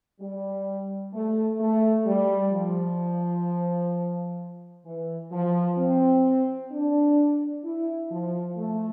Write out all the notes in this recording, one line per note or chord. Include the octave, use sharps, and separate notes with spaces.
G3
A3
A3
G3
F3
E3
F3
C4
D4
E4
F3
A3